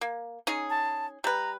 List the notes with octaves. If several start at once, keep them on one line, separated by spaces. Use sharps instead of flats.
A#3
C#4 D#4 G#4
A5
G3 B4 A#5